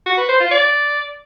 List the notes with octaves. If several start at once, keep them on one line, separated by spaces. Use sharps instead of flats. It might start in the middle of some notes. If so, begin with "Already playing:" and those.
F#4
B4
C5
F4
D5